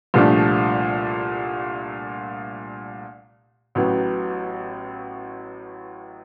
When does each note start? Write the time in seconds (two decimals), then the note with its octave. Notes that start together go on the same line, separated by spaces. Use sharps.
0.14 C2 A#2 F3 A3 D4
3.75 A1 A2 F#3 B3